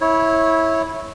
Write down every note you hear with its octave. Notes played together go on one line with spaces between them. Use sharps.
E4 C#5